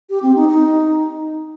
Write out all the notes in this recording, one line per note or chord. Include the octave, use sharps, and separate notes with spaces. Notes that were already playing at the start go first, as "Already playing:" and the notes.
G4
C4
D#4
D#4